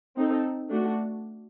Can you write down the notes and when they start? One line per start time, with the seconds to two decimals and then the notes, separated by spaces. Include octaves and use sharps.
0.16 C4 D#4 A4
0.69 A3 D4 F#4